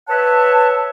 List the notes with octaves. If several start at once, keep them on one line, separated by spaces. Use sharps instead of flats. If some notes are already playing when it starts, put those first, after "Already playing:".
B4 C#5 E5 F#5 A5